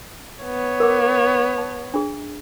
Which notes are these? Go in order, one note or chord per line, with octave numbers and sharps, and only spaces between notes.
B3 C#5
A#4 F#5 D6
A5
D4 G#4